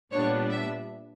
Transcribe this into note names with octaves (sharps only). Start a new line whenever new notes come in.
A#2 G3 B3 D4 C#5
E5